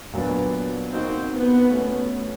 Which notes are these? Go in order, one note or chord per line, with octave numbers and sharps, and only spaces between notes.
A#2 F#3 B3 D4
A#3 C4 D#4 F#4
B3
A3 C#4 F#4 B4